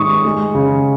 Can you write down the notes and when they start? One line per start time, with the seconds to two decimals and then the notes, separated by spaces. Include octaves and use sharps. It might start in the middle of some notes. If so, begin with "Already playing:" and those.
Already playing: G#2 D#3 C#6 D#6
0.24 G#3
0.55 C#3